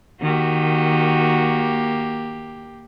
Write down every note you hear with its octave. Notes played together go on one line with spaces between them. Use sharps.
D#3 A#3 F#4 G4